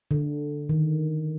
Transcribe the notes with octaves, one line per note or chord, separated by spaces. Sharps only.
D3
D#3